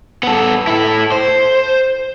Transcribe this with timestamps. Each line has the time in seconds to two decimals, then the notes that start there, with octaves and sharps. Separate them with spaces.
0.23 B3 A4
0.67 E4 A4
1.12 C5